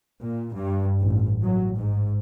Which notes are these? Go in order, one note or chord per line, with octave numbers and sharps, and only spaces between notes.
A#2
G2
A1
F#3
G#2